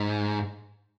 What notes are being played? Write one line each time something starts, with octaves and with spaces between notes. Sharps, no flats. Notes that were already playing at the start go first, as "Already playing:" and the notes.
Already playing: G#2